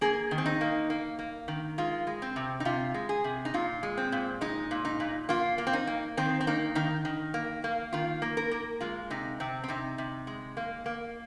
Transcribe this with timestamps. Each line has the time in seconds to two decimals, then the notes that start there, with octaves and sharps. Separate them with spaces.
0.01 A#3 G#4
0.31 D#3
0.38 C4
0.46 D#4
0.61 A#3
0.90 A#3
1.19 A#3
1.48 D#3
1.78 G#3 F4
2.07 G#3
2.22 C4
2.36 C3
2.60 D#4
2.65 C3 F4
2.94 G#3
3.09 G#4
3.24 C3
3.45 D#4
3.54 A#2 F4
3.83 G#3
3.97 C4
4.12 A#2
4.41 G#3 D#4
4.71 A#2
4.85 D#4
5.00 A#2
5.29 A#3 F4
5.58 A#3
5.67 C4
5.73 D#4
5.87 A#3
6.17 D#3 C4
6.41 C4
6.47 A#3 D#4
6.75 D#3 D#4
7.05 D#3
7.34 A#3
7.64 A#3
7.93 D#3 F4
8.22 A#3
8.37 A#4
8.51 A#3
8.81 G#3 F4
9.10 C3 D#4
9.40 C3 C4
9.64 C4
9.68 C3 D#4
9.98 C3
10.27 G#3
10.57 A#3
10.86 A#3